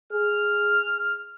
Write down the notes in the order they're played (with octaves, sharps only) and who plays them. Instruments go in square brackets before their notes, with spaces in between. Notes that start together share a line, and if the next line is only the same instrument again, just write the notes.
[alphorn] G#4 [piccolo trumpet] F6